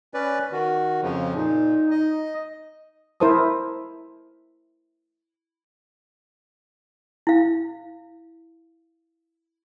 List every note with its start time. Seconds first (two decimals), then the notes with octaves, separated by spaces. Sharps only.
0.14 C#4 B4 D5
0.52 D#3 F#4
1.02 F2 C#3 F3
1.34 A#2 D#4
1.91 D#5
3.20 E4 A#4 C5 A5 D#6
7.27 E4 F5